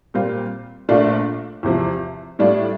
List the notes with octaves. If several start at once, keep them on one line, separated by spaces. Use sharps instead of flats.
A#2 G3 C4 F4
A#1 A#2 A3 D4 F4
E2 C3 F3
A2 G3 D4 F4